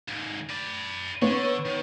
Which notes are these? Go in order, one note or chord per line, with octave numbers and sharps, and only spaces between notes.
D#2 G#2
B4 D5
D3 B3 C#5
D#3